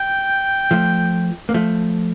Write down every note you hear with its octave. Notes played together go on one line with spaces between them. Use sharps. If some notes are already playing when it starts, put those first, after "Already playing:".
Already playing: G5
F3 A3
A#3
F3 A3